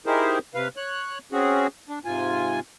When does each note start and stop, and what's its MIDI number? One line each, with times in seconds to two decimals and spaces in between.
0.06 0.39 63
0.06 0.39 64
0.06 0.39 67
0.06 0.39 68
0.06 0.39 70
0.06 0.39 72
0.54 0.68 48
0.54 0.68 71
0.54 0.68 77
0.77 1.19 73
0.77 1.19 90
1.32 1.67 60
1.32 1.67 61
1.32 1.67 66
1.32 1.67 68
1.89 1.99 62
2.05 2.60 44
2.05 2.60 48
2.05 2.60 65
2.05 2.60 80